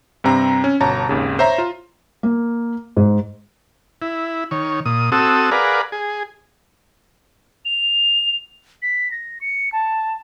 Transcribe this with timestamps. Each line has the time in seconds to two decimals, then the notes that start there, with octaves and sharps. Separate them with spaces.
0.24 G2 C3 C4 A#5
0.64 C#4
0.80 G1 B2 C#5 A5 A#5 A6
1.09 G#1 D#2 C#3
1.39 C5 C#5 E5 A#5
1.58 F4
2.23 A#3
2.97 G#2
4.02 E4
4.51 D#3 C#5
4.86 A#2 D#6
5.12 C4 F#4 A4 D#6 E6
5.51 G#4 A#4 B4 D5 F5 F#5
5.92 G#4
7.65 F7
8.82 B6
9.11 A#6
9.41 C#7
9.73 A5